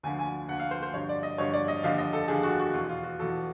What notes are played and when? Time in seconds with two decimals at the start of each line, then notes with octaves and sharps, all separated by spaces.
0.03 D2 D3 F3 G#5
0.19 G#5
0.48 D2 D3 F3 F#5
0.60 F5
0.71 C5
0.83 C5
0.93 G2 D3 F3 C#5
1.09 D5
1.23 D#5
1.38 G2 D3 F3 C#5
1.54 D5
1.68 D#5
1.83 D#2 D3 F3 F5
1.98 D#5
2.13 A4
2.28 D#2 D3 F3 G#4
2.43 F#4
2.59 F#4
2.73 E2 B2 F4
2.89 F4
3.03 F#4
3.19 B2 A4
3.22 E2